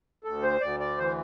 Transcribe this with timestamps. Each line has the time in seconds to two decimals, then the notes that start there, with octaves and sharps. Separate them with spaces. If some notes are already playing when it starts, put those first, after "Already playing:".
0.24 D2 A4
0.43 C5
0.61 D2 D5
0.80 D5
0.98 E3 C5